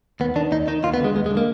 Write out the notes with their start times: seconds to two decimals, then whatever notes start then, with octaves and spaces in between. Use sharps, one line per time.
0.20 D#2 B3
0.36 D#3 D4
0.52 D#2 D#4
0.68 D#3 D#4
0.83 D#2 F4
0.94 B3
1.00 D3 G#3
1.15 D#2 G#3
1.26 G#3
1.31 D3
1.37 A#3